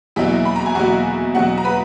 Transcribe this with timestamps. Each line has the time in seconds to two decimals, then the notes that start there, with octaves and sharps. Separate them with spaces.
0.16 E2 B2 F#3 A#3 E4 E5
0.45 B5
0.56 A#5
0.66 G#5
0.75 E2 B2 F#3 A#3 F#4 F#5
1.35 E2 B2 F#3 A#3 F#4 F#5
1.58 A#5
1.64 B4 B5